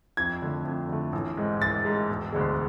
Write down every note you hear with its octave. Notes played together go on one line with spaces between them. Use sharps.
F2 G#6
D3 A3
F2
D3 A3
A1
G#2 G#3
A1 A6
G#2 G#3
E1
D2 D3 G#3